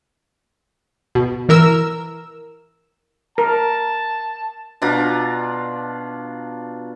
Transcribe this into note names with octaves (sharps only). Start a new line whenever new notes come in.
B2
E3 A#4 E6
A#4 A5
B2 D4 F4 A#5